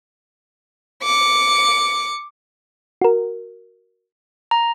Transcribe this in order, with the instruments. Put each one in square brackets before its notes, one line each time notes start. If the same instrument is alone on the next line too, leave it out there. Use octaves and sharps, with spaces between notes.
[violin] D6 C#7
[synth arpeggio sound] F#4 A#4
[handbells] A#5